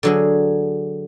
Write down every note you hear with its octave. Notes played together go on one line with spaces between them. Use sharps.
D3 F#3 G#4